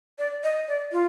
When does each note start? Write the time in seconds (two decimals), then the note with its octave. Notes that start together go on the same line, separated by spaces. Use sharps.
0.19 D5
0.43 D#5
0.68 D5
0.92 F4